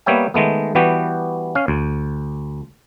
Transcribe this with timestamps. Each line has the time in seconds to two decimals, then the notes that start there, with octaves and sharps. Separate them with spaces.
0.06 G3 A#3 B3 C#5 E5 G5
0.34 D#3 G#3 A3 B3
0.75 E3 G3 B3 F#4 G4
1.55 C#4 F5
1.68 D2